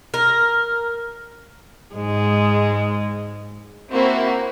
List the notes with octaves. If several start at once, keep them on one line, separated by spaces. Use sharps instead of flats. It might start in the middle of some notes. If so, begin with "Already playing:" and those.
A#4
G#2 G#3
A#3 C4 E4 F#4